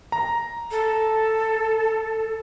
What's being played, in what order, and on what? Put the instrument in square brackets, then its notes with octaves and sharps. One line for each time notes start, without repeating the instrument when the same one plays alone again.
[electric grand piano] A#5
[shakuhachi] A4